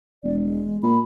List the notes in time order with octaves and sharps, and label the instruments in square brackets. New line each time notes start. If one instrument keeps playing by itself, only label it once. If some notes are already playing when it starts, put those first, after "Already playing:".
[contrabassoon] E1 [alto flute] D5
[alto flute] G#3
[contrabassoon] A#2 [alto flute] B5